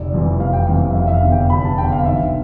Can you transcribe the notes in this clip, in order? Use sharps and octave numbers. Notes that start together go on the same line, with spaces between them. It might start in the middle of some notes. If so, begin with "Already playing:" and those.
Already playing: F1 D5
F2 C3 E3 G3
F1 F5
G5
F2 C3 E3 G3 F5
E5
F1 F5
E5
F5
E2 D3
G5
F1 B5
A5
E2 D3 G5
F5
B1 E5